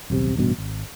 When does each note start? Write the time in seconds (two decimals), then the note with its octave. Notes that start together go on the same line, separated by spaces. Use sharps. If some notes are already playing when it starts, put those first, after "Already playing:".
0.10 D#1 B1 A2 C3
0.37 A1 G2 B2
0.58 G#1